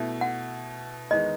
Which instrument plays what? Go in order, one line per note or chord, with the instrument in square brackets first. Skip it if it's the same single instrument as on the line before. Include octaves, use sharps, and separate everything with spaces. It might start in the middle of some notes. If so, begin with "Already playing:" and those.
Already playing: [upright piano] B2 A3 E4
[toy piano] F#5
[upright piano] E2 D#3 G#3 B3 D#4 [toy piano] D#5